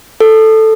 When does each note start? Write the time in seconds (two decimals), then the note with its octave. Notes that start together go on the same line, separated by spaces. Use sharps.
0.20 A4